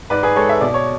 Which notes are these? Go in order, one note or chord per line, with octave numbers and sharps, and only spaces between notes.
G#2 B4 D5
G#4 B4
G#3 A4 C#5
E5
B2 D5
C#5